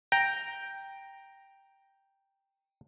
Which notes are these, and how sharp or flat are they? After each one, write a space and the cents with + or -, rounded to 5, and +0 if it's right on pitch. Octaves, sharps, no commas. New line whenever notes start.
G5 +0 A#5 +0